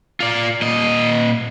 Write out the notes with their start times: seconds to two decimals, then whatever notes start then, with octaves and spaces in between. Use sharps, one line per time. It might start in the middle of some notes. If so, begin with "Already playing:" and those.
0.20 F4 D5
0.62 A#2 D#5